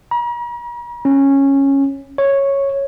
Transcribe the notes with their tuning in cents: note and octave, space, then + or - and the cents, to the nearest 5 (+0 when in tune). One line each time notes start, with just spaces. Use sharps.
A#5 +45
C#4 -10
C#5 -5